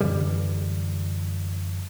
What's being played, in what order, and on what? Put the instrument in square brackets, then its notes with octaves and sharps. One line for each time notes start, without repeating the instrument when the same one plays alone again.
[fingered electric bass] F#2 D3 E3 G3